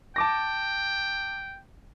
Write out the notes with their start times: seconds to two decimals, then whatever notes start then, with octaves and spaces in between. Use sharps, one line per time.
0.16 G5 A5 D6 A#6